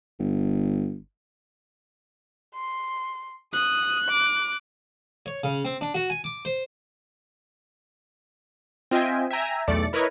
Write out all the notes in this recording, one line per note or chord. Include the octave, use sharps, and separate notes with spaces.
G1
C6
D#6 F#6
D6
C#5
C#3
C4
D4
F#4
G#5
D6
C5
C4 F4 D#5 E5 G5 G#5
E5 G5 G#5 A#5
B1 E2 A3 D5 A6 C#7
E4 A#4 B4 C#5 D#5